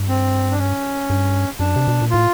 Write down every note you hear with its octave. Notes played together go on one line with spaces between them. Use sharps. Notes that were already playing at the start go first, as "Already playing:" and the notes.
Already playing: G2
C4
D4
C#4
G2
F#2 D4
C3
B2
A#2
A2 F4